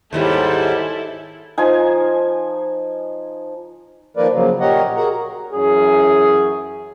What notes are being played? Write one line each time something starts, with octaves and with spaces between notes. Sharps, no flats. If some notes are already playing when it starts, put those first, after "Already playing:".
D#2 G#2 G3 E4 A4
F3 D#4 G#5
D#3 F3 A#3 A#4 B4 D5
C#3 F3 F#3 A#3
A#2 G4 A#4 C#5 D#5 F#5
F#4 G#4 A#4 F#5 A#5
F#2 E3 C#4 G#4